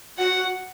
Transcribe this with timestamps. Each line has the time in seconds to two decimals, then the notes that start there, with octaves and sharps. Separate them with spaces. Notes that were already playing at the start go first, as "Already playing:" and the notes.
0.18 F#4 F#5